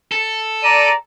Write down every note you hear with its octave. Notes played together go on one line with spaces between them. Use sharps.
A4
D5 A#5 D#7